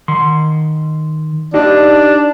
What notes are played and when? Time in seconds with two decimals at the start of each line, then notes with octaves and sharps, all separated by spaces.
0.08 D#3 C6
1.54 D4 D#4 G4 D#5